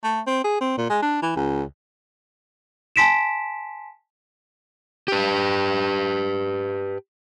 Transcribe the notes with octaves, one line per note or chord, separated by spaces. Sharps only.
A3
C4
G#4
C4
A#2
G#3
D4
E3
C#2
G#5 A5 C6 B6 D7 E7
G4 B4